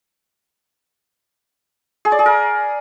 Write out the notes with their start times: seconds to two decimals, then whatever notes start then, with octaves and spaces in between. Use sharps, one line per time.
2.05 G#4
2.12 D5
2.19 G#4
2.26 A#4